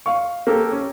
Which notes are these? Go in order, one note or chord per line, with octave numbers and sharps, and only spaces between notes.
F5 C#6
A#3 G4 A4
C#4